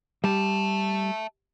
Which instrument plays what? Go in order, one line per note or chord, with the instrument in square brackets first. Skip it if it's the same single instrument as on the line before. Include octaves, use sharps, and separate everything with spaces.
[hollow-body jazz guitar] G3 [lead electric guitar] E5 A5